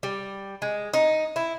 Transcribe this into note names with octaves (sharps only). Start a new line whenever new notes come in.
G3
G#3
D#4
E4